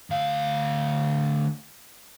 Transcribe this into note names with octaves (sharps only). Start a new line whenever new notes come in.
D2 F5